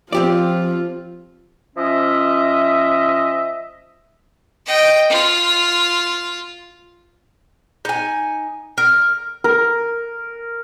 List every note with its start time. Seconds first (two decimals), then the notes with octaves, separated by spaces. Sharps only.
0.13 F3 C4 F4 G4 D5
1.76 F3 C#4 D#5 E5
4.66 D#5 G5
5.09 F4
7.85 D#4 G#5
8.78 A#4
9.44 A#4